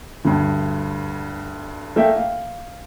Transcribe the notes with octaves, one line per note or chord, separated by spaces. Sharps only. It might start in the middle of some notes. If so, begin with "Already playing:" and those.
D2 G2
A3 A#3 E5 G5
F5